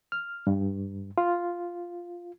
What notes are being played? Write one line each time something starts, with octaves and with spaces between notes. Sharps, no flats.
F6
G2
F4